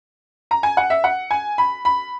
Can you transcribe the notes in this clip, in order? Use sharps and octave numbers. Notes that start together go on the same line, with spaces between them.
A#5
G#5
F#5
E5
F#5
G#5
B5
B5